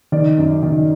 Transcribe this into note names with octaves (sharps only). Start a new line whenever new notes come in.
D#3 D5
F#2
D#3